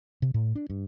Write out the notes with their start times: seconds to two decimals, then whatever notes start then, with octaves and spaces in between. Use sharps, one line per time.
0.22 C3
0.34 A2
0.55 D4
0.70 G2